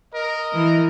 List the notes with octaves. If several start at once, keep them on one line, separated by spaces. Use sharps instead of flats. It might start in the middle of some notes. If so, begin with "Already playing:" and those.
A#4 D#5
E3